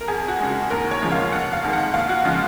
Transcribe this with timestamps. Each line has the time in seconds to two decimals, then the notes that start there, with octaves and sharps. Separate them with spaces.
0.01 A#4
0.07 F2 G#4
0.28 F#4
0.38 C#3 G#3
0.49 F#4
0.70 D#2 A#4
0.91 C#5
1.02 C#3 F3 G#3
1.12 F5
1.32 F1 F#5
1.53 F5
1.63 F2 D#3 G#3
1.73 F#5
1.94 D#2 F5
2.09 F#4
2.25 C#3 F3 G#3 F4